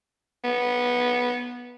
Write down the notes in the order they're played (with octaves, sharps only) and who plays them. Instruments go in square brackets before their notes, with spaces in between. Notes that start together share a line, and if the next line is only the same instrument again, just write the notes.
[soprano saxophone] B3